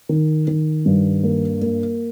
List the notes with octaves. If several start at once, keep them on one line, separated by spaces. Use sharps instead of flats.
D#3
D#3
G2
A#3
A#3